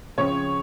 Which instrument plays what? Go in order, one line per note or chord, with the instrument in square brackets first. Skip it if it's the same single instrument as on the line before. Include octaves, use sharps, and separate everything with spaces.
[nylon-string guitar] C#3 F3 C4 F4 [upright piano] C#5